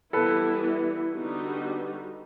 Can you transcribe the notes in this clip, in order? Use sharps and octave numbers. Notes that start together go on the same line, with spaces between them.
E3 G3 B3 E4 A4 B4
D3 G3 B3 D#4 F#4